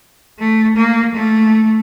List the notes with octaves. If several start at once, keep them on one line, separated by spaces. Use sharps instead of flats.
A3
A#3
A3